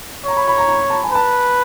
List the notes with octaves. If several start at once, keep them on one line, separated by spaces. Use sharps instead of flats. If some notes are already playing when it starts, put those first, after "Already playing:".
C#5 A#5
B5
B5
A#5
A#5
A5
G#5
B4 A5